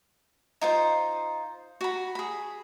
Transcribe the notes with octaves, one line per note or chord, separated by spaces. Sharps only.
D#4 F4 C5
F#4 B5
G#4 B5